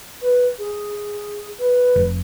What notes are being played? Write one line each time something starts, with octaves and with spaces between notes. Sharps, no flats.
B4
G#4
B4
F1